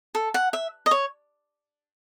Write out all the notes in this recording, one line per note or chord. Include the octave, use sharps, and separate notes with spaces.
A4
F#5
E5
D#5
C#5